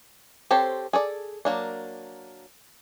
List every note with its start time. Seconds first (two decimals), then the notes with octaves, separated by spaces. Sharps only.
0.51 C4 G4 A4 C5 C#5
0.93 G#4 A4 D5
1.45 F#3 A#3 D4